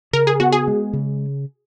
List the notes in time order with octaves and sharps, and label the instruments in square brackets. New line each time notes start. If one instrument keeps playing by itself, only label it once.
[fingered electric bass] C#3 [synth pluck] A#4
[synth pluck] G#4
[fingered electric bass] B3 [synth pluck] F#4
[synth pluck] G#4
[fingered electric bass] G#3
C#3